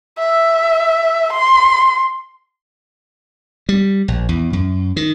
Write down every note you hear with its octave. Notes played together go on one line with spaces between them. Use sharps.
E5
C6
G3
A#1
E2
F#2
D#3